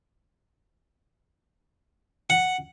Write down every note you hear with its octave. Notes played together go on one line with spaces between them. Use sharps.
F#5